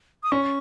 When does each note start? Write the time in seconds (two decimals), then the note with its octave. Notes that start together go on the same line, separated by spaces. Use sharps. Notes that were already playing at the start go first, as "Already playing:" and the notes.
0.23 D#6
0.32 C#4 C#6